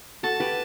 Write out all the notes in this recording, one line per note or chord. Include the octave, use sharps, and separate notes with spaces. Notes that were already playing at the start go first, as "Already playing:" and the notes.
F#4 A4 A5
G4 B4